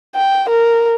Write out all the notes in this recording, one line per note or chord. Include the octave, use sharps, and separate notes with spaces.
G5
A#4